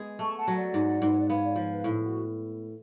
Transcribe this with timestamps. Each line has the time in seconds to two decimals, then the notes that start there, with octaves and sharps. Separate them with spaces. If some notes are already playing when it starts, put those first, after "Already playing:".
Already playing: G#3 B3 G#4
0.19 A3 A5 C#6
0.38 F#5 A5
0.48 F#3
0.56 D5 F#5
0.74 G#2
1.02 G#2 B4
1.12 C#5
1.20 D5
1.29 B3 C#5 F5
1.44 D5
1.56 F3 C#5
1.71 B4
1.84 A2 A4
2.02 F#4